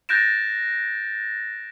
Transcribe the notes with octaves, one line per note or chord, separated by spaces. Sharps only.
F#6 G6 A6 A#6 D7 E7